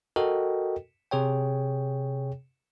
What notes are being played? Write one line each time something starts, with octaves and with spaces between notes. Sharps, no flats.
F#4 A4 A#4 D#5 G5
C3 G#4 C#5 G5